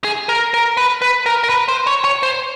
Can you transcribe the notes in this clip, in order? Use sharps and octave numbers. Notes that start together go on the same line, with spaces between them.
G#4
A#4
A#4
B4
B4
A#4
A#4
B4
C5
C#5
C#5
C5